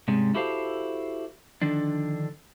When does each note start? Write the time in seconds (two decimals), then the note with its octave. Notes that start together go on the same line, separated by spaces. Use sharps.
0.08 G#2 C3 G3 G#3 C#4
0.35 E4 F#4 G4 A4 C5 F5
1.62 D3 D#3 F3 D4